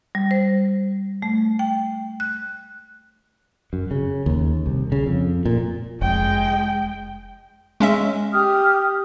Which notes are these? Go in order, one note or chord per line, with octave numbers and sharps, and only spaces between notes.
G3
C5
A3
G5
F#6
F#2
C#3
D#2
C2
C#3
F2
A#2
F1 G#3 G5
G#3 C#4 E5
G4 D#6 F6